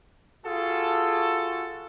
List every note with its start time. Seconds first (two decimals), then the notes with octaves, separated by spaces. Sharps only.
0.46 F4 F#4 G#4 A4